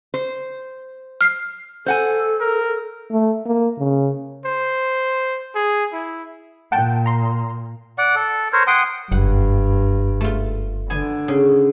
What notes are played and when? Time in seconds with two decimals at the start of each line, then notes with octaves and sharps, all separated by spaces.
0.14 C5
1.21 F6 C7
1.86 A4 C5 F#5 G#5
2.41 A#4
3.11 A3
3.46 A#3
3.78 C#3
4.45 C5
5.55 G#4
5.93 E4
6.72 A#2 F#5 G5 A5
7.06 A#5 C6
7.98 D5 F#5
8.15 A4
8.53 A#4 C5 C#5
8.67 F#5 G5 C6 D#6
9.12 F#1 G2 F#5
10.21 A3 F4
10.90 D3 B3 G#5
11.28 C#3